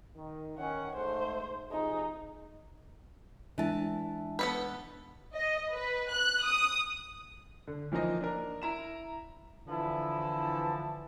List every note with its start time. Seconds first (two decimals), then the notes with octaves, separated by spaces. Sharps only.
0.16 D#3
0.58 D#3 C#4 F#5
0.96 G#2 A3 C5
1.71 F2 C3 D#4 G#4
3.58 E3 G#3 D4 A5
4.39 B3 A4 B4
5.36 D#5
5.73 B4
6.12 F#6
6.45 D#6
7.67 D3
7.92 E3 F3 A#3 D#4 D#5
8.21 D4 A#4
8.62 E4 A#5 E7
9.68 D3 E3 F3 E4 A5